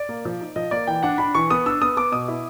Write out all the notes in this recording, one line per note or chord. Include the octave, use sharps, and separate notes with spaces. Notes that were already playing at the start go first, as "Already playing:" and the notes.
Already playing: D5
A#3
F3
D#4
F3 D#5
A#3 D5
E3 G5
D4 F#5
D4 B5
E3 C#6
B3 D#6
D4 E6
B3 D#6
B3 D6
B2 D#6
E4